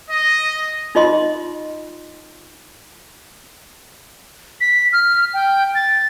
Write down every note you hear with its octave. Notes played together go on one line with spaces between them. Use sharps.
D#5
D#4 F4 D#5 C6
B6
F6
G5
A6